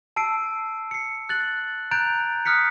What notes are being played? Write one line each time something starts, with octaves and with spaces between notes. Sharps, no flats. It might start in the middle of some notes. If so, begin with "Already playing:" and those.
A5 E6 C7 D7
C7 C#7
F#6 A6 F#7
A#5 F#6 G6 A6 D7 F7
D#6 F6 F#6 B6 C#7